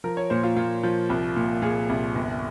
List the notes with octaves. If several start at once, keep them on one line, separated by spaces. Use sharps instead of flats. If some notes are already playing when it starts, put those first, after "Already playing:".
F3 A#4
C#5
A#2 C5
F4
A#2 F4
F3
C2
A#2
A#2 G#4
C2
G1